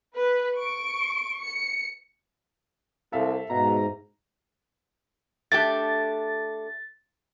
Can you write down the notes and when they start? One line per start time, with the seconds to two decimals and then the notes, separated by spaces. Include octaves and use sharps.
0.14 B4
0.56 C#6 D7
1.41 C#7
3.12 C2 A4 E5 F5
3.50 G#2 B2 A#5
5.52 A3 D4 G4 A6